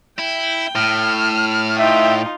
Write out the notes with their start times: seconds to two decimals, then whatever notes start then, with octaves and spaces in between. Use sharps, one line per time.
0.18 E4 G5
0.75 A2 F6
1.79 D#4 F4 E5 G5